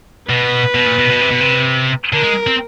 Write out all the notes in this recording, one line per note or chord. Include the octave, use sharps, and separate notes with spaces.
B2 B4
B2
A#2
B2
B2
C3
B2
C3
D3 A#4
G#3
C4